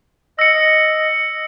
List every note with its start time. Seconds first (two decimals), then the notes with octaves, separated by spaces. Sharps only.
0.39 D#5 E6 C#7